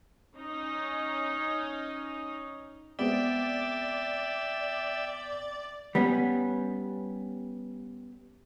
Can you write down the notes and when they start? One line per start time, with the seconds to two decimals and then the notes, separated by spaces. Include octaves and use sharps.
0.36 C#4 D#4
2.99 G#3 B3 C4 D5 E5 G5
5.95 G3 B3 C#4